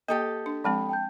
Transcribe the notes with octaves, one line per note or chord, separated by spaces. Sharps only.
A#3 G4 A4 D#5
D4
F3 G#3 C4 G5 A5 B5
G5 A5 G6